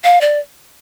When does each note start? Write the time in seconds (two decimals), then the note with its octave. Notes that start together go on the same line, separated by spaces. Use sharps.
0.04 F5
0.21 D5